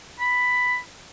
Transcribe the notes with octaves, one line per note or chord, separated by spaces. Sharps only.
B5